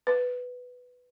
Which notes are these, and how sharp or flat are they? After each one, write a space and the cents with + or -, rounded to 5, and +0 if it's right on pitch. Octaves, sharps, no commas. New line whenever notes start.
B4 +5